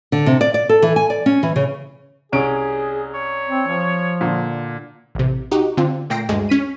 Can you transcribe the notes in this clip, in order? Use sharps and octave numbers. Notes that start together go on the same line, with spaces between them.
D3
C3
D5
D5
A4
E3
G#5
D5
C#4
E3
C#3
C2 C#4 G#4 D7
C#5
C4
F3
A#2 D3
A1 C3
D#4 F#4 G4
D3 C4 F4
A#2 A3 G5 A#6 C7 D7
D2 G2 G#3
C#4 B6 D#7